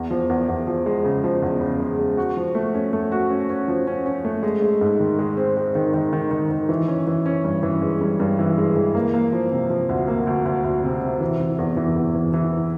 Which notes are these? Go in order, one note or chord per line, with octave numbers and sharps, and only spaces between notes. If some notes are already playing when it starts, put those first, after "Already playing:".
Already playing: E2
F3
E2
E2
F3
G#3
C#3
F3
E2
C#3
G#3
G#3
F#4
F3
A3
C#4
A3
F#4
C#4
C#4
F3
C#4
C#4
A3
G#3
G#3
G#2
D#3
G#3
C4
G#3
D#3
D#3
D#3
D#3
D#3
E3
C#4
E3
C#4
G2
E3
G#3
G2
G2
E3
G#3
E3
A#3
A#3
F3
C3
F3
D2
A#3
D2
D2
D2
C3
C3
E3
E3
E2
E3
E2
E3
E3